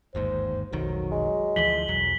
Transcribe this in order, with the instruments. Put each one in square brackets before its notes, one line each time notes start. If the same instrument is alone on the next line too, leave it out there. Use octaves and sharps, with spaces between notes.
[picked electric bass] G1 D#2 G#2 [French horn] C5
[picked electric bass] F1 B1 D#3 [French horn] F#3
[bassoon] G#3
[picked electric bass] D2 E3 F3 [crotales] B6 F#7 G7
[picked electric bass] B1 E2 F#3